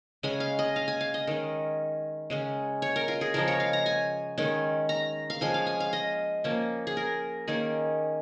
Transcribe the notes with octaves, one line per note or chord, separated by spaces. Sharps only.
C#3 G#3 C#4 G#5
F5
D#5
F5
G#5
F5
D#5
D#3 G#3 C#4
C#3 G#3 C#4
C#5
A#4
F4
G#4
C#3 F3 G#3 A#4
C#5
F5
A#5
G#5
D#3 G#3 C#4
A#5
F5
F3 G#3 C#4 G#5
F5
G#5
F5
D#5
F3 A#3 C#4
G#4
A#4
D#3 A#3 C#4 G#4